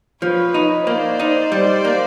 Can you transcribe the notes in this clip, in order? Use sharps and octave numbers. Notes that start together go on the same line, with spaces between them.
F3 B4 C#5
D#4
A#3 C5 D5
D#4
G3
A#3